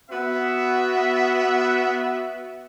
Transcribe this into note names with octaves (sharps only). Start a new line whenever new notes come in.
B3 F#4 E5